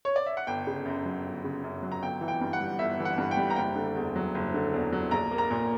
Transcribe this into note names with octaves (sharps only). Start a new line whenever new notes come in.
C#5
D5
E5
F#5
G1 G5
C#3
F#2
F#3
G1
C#3
F#2
F#3
A#5
G1 G5
E3
G5
G2
F#5
G3
G1 E5
E3
F#5
G2
G5
G3
A#5
F#1 G5
D3
E2
F#3
F#1
D3
E2
F#3
A#1 A#5
A#3
A#5
A#2